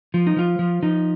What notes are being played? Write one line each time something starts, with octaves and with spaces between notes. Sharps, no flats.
F3 F4
D#4
F3 F4
F3
F3 D#4